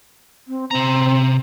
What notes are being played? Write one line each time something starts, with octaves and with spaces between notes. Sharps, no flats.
C4
C3 C4 A#5